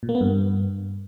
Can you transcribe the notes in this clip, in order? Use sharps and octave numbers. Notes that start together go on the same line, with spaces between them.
A#2
A#3
B3
G2